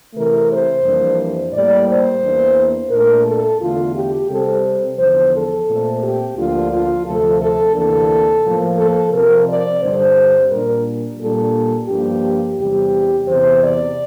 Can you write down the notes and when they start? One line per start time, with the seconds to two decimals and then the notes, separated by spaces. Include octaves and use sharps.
0.14 C3 E3 A3 A#4
0.50 C5
0.84 F2 E3 G3 A#3 D4
1.53 A2 G3 A#3 D5
1.87 C5
2.21 E2 E3 A#3 D4
2.90 A#2 A3 D4 A#4
3.25 A4
3.60 E2 D3 A3 F4
3.94 G4
4.28 C3 G3 C4 A4
4.98 E2 D3 F3 C5
5.32 A4
5.67 A#2 A3 C4
6.01 G4
6.36 D2 D3 F3 A#3 D4 F4
6.70 F4
7.05 D2 C3 F3 A3 A4
7.40 A4
7.74 D2 C3 E3 A#3 D4 A4
8.44 A2 F3 A#3
8.77 A4
9.12 C3 F3 C4 A#4
9.48 D5
9.81 G2 D3 G3 C4 C5
10.50 A#2 G3 D4 A#4
11.20 A#2 G3 D4 A4
11.88 G2 F3 A#3 D4 G4
12.57 E2 C3 G3 G4
13.27 E2 C3 E3 C5
13.62 D5